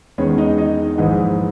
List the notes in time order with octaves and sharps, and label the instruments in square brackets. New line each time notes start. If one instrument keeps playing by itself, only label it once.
[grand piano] E2 D#3 G#3 B3 C#4 C#5
D#4 D#5
D#4 D#5
A#1 G#2 E3